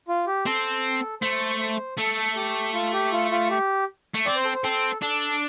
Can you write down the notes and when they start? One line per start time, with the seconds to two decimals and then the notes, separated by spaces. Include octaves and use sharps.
0.08 F4
0.27 G4
0.46 C4 A4
1.22 A3 C5
1.60 C5
1.98 A3 A4
2.35 G4
2.74 F4
2.93 G4
3.12 F4
3.31 F4
3.50 G4
4.14 A3
4.26 C4 D5
4.35 C5
4.45 A4
4.54 C5
4.64 C4 A4
5.02 D4 A4